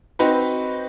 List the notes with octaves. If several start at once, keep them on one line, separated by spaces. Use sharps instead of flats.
C4 D#4 F#4 B4